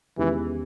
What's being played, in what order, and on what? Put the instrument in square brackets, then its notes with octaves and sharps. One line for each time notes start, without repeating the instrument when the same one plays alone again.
[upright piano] E2 D#3 G#3 C#4 G4 [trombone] E3